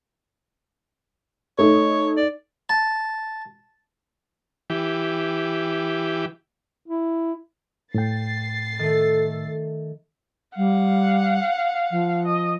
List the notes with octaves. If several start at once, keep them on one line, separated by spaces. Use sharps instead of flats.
A3 D#4 C#5
D5
A5
E3 G4
E4
A2 G5 A6 C7
D#3 A3 A4
G3 F5 F#5
F3
D#5